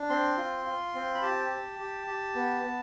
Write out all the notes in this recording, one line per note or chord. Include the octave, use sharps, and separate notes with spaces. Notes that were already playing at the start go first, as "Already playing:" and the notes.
Already playing: D4
C4 C6
F4
F4
C4
B5
G4 A5
G4
G4
G4
B3
B3